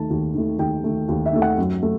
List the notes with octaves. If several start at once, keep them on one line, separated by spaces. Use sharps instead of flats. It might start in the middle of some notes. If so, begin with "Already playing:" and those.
Already playing: D#2 D#3 A3 A5
D#2
D#3 A3
D#2 G5
D#3 A3
D#2
E5
D#3 A3
F#5
F#2
A3